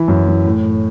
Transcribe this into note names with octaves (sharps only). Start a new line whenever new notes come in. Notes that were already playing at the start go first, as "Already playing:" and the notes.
Already playing: E3 E4
F#2
E3
A2
A2